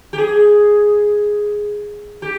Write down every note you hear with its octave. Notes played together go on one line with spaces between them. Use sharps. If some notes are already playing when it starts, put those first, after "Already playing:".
G4
G#4
G4